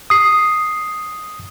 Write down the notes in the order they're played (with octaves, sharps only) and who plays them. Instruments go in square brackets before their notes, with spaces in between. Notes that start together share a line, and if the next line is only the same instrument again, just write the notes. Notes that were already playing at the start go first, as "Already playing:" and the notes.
[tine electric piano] D#6 C7